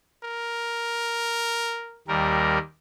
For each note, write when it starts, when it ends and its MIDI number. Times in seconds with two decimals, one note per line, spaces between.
0.24 2.04 70
2.08 2.58 39
2.08 2.58 55
2.08 2.58 70